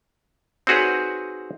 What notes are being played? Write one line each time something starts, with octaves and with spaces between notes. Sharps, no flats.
C4 D#4 F#4 G#4 B4 C#5